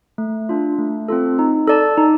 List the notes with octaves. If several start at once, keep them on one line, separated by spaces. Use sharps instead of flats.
A3
D4 F4
A3
C4 F4 A4
D#4
A4 D5 A5
D#4